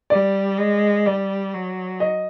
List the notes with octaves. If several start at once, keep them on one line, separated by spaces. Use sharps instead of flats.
G3 D5
G#3
G3 D5
F#3
D#5